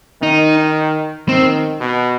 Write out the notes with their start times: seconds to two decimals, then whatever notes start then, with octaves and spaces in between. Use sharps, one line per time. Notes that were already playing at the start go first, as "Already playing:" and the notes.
0.22 D#3 D#4
1.29 D#3 C4
1.81 B2